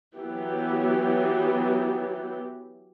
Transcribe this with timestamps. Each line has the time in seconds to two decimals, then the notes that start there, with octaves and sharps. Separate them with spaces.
0.17 E3 F#3 B3 G4